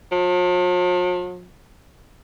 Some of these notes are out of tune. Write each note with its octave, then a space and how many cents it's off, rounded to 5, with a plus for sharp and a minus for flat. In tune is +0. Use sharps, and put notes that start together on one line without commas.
F3 +45